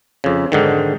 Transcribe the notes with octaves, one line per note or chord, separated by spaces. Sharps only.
F2 C#3
G#2 D3 D#3